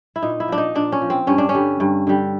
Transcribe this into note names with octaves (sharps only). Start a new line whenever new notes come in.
E4
A#2 D#4
E4
F3 D4
D#4
A#2 D4
C#4
F3
C4
G2 C#4
D4
C#4
D3 G3
G2
D3 G3